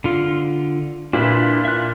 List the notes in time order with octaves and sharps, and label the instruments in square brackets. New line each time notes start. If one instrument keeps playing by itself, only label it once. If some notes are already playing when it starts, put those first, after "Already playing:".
[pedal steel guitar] D3 F4
[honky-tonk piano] A#2 [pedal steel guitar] D4 E4 B4
[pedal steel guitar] E5 F#6